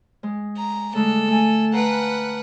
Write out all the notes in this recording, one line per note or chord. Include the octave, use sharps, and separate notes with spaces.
G#3
A#5
D3 G#3 A3 A4
A3 G#5
B4 F5 F#5 A5 A#5